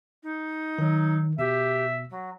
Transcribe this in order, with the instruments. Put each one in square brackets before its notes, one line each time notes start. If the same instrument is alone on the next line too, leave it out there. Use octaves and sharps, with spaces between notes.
[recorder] D#4
[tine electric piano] D#3 [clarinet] F#3
[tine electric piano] B2 [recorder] G4 [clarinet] E5
[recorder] F#3